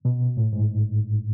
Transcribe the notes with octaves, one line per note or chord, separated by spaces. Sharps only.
B2
A2
G#2